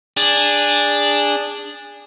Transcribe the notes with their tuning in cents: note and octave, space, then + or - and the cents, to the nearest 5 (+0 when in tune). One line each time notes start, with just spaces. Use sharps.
D4 +0 G#4 -20